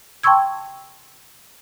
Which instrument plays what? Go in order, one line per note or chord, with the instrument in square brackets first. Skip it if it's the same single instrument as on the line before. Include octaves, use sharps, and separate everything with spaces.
[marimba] G5 A5 C6 C#6 E6 G#6